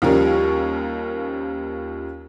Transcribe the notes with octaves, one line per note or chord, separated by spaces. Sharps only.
D#2 F3 G3 C#4 A#4